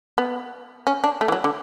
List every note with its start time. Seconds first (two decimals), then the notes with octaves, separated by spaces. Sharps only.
0.18 B3
0.87 C#4
1.04 D4
1.21 A3
1.28 E3
1.32 F#3
1.44 D3